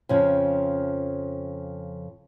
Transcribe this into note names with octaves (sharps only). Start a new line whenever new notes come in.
F2 C#3 F3